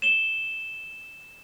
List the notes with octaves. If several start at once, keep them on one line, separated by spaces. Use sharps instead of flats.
E7 G7